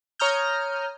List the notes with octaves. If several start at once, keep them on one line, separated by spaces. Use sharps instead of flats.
C#5 A#5 D#6 F6 G6